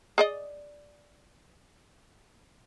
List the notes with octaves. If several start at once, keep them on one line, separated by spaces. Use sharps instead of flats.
G#4 D5 D#5